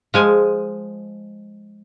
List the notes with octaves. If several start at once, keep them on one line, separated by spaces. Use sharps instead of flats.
F3 G#3 G#5